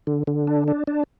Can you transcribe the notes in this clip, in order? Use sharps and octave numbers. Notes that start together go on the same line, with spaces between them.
D3
D3
D4
D4
D4